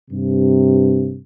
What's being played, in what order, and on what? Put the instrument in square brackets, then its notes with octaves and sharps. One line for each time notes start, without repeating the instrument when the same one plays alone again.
[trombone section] G2 C3